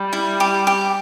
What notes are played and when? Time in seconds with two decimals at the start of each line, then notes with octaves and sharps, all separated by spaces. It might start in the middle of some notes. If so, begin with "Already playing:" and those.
Already playing: G3
0.13 E4
0.40 G4
0.67 G4